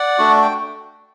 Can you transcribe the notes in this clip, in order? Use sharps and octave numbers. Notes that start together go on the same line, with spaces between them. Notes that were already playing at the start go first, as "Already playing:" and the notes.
Already playing: D5 F#5
A3 D4 F#4
G5